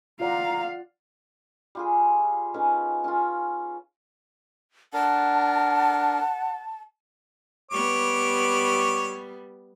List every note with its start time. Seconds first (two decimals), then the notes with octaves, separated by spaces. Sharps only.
0.20 F4 D5 F5 F#5 A#5
1.75 G3 F4 G#4
2.54 D#3 C#4 B4
3.04 C#4 F4
4.94 D4 A#4 F#5 A5
7.71 G3 B3 C#5 D6